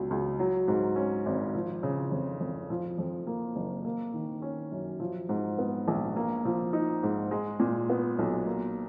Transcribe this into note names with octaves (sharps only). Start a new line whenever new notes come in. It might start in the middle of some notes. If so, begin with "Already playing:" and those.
Already playing: C#2 B2 F#3
C#2
F#3
G#2
C#4
G#1
F3
C#3
F2
F2
F3
F2
A#3
F#1
A#3
D#3
C#4
F#2
F3
G#2
B3
A#1
A#3
F3
D#4
G#2
G#3
A#2
B3
B1
A#3